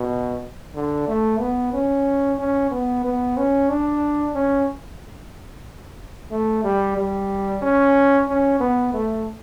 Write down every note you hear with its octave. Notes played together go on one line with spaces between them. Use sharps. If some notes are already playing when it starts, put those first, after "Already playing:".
Already playing: B2
D3
A3
B3
C#4
C#4
B3
B3
C#4
D4
C#4
A3
G3
G3
C#4
C#4
B3
A3